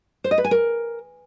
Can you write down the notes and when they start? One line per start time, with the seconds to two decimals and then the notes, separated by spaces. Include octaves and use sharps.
0.24 C5
0.31 D#5
0.38 B4
0.44 G#5
0.51 A#4